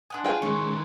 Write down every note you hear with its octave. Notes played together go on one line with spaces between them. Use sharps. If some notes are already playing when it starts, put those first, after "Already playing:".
D4 F#5 G#5 C6 D#6
F4 G#4 G5
D#3 E3 G#3 C#4 C6 C#6